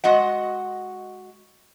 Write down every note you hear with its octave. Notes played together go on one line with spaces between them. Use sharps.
G#3 F#4 D#5 F#5